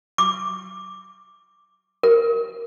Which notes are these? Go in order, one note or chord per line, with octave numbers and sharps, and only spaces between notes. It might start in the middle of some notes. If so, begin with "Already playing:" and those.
D6
A#4